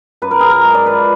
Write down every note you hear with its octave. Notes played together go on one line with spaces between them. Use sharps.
F#2 B4
A#4
F#2 G#4
A#4
G#3
D5
F3 B4